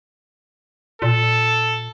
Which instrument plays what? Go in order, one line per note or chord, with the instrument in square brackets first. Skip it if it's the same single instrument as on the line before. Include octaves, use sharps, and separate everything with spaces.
[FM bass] A#2 [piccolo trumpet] A4